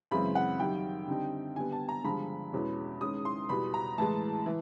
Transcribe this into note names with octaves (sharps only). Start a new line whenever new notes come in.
F#2 C#3 E3 G#3 C4 B5
F#5
F#2 D#3 G3 G5
D3 G3 C4 D#4
D3 G3 B3 G#5
A5
A#5
G2 D3 F3 G#3 B5
E2 B2 G#3 C#4
D#3 G#3 C#4 D#6
C6
E2 B2 G3 B5
A#5
A2 E3 G#3 A5
E3